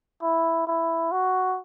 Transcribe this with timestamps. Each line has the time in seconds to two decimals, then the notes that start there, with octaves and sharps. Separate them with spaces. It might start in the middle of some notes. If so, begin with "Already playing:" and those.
0.22 E4
0.67 E4
1.12 F#4